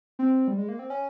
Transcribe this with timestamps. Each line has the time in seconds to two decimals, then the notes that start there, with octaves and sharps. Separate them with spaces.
0.19 C4
0.48 G3
0.58 G#3
0.69 A#3
0.79 C4
0.90 C#4